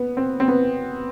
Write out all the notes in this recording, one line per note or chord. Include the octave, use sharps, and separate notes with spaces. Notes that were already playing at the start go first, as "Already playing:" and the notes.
Already playing: B3
C4
C4
B3